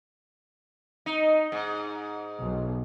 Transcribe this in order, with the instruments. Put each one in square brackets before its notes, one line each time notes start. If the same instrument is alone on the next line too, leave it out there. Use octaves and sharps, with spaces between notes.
[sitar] D#4
G#2
[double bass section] B1